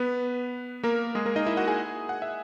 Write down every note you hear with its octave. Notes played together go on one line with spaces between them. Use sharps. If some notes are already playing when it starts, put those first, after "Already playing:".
Already playing: B3 B4
A#3 A#4
G#3 G#4
A#3 A#4
D#4 D#5
E4 E5
F#4 F#5
G#4 G#5
F#5
E5